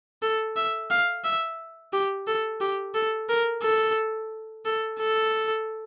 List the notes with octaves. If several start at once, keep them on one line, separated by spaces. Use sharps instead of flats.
A4
E5
F5
E5
G4
A4
G4
A4
A#4
A4
A4
A4